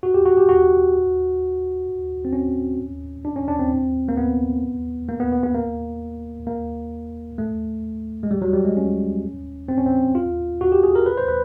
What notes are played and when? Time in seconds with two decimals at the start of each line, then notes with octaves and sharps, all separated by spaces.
0.03 F#4
0.14 G4
0.26 F#4
0.37 G4
0.49 F#4
2.25 C4
2.33 C#4
3.25 D4
3.36 C#4
3.48 D4
3.59 C4
4.09 A#3
4.17 B3
5.08 A#3
5.20 B3
5.32 B3
5.43 B3
5.55 A#3
6.47 A#3
7.38 A3
8.23 G#3
8.31 G3
8.42 F#3
8.54 G3
8.65 G#3
8.77 C#4
9.68 C4
9.78 C#4
9.86 C4
10.15 F4
10.61 F#4
10.72 G4
10.83 G#4
10.95 A#4
11.06 B4
11.17 C5
11.28 B4